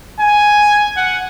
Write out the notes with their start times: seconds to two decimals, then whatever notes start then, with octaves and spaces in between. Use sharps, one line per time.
0.19 G#5
0.97 F#5